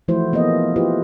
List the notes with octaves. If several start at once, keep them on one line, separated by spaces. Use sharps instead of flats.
E3 F3 A3 E4 F#4 C5
E3 A#3 B3 G#4 D#5
E4 F4 G4 B4 C5